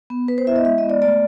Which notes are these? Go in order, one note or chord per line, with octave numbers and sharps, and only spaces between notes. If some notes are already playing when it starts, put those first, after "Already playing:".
B3
B3 B4
C5
E4 E5
D#5
G#3 E5
D#5
B3
D5
A3 D5